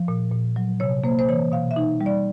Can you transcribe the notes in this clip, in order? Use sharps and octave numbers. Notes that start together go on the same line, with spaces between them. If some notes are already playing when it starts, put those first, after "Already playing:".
Already playing: F3
A#2
A#2
F#3
C3 C#5
A#3 C5
C5
E3 C#5
B2 F5
E5
D#4
G3
D5